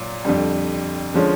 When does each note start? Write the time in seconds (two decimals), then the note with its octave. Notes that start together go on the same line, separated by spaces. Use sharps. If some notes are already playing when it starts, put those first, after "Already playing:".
Already playing: A#2 F#3
0.25 F2 D3 G3
1.14 D3 F3 G#3 C#4